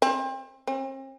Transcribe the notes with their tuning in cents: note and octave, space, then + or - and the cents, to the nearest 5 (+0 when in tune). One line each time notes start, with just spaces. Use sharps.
C4 +30
C4 +45